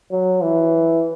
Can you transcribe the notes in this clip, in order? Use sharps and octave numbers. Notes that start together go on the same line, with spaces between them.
F#3
E3